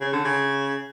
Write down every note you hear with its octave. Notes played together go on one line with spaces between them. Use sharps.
C#3
D3
C#3